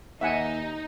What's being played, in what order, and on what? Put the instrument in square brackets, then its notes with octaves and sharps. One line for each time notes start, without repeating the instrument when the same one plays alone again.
[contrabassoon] D#2 [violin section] D#4 [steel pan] E5 F#5 G#5